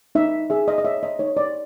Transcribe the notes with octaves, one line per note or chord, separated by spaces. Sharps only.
D#4 E5
G#4 E5
D#5
D#5
C#5 E5
D#5
D#4 C#5
D5